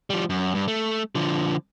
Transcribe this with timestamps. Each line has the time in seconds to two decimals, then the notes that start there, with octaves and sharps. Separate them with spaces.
0.10 F3 G3
0.30 F#2
0.55 G2
0.68 A3
1.15 D3 F3